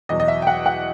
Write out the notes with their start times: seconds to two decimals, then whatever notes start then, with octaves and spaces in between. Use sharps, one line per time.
0.09 E2 B2 F#3 D#5
0.20 D#5
0.28 E5
0.42 G5
0.47 F#5
0.66 F#5